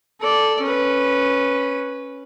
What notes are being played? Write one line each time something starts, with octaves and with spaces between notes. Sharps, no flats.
A4 D5
C#4 B4